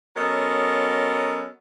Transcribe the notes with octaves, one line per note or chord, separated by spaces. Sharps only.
F#3 B3 C#4 A4 A#4 D#5